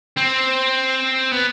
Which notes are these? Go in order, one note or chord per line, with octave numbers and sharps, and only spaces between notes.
C4
B3